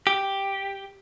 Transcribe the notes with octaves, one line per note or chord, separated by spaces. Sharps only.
G4